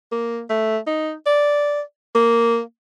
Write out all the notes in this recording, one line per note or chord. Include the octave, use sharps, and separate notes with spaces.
A#3
A3
D#4
D5
A#3